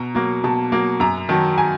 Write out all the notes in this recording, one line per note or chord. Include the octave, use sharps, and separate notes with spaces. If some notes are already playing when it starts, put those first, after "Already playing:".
Already playing: B2 A#5
F#3 A#3
B2 A5
F#3 A#3
F#2 A#5
D#3 F#3 A5
G#5